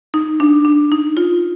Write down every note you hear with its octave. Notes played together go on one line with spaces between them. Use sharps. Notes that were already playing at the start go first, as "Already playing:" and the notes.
D#4
D4
D4
D#4
F4